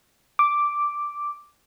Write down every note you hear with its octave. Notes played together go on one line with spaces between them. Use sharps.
D6